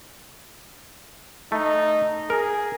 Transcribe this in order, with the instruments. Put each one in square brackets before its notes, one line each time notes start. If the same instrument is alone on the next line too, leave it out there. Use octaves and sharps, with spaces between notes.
[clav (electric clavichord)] A3 [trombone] D#4
[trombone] G#4 [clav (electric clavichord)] A#4